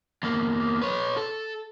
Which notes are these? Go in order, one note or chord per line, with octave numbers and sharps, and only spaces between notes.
E2 A#3
B4 C#5
A4